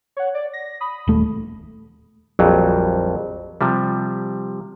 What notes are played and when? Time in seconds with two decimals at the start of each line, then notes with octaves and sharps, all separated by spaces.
0.17 C#5 F#5
0.34 D5
0.53 A#6
0.80 B5 D#6
1.08 D#1 A3
2.39 A#1 F2 F#3 G3
3.61 C3 F3 G3